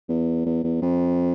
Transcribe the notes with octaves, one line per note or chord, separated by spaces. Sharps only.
E2
E2
E2
F2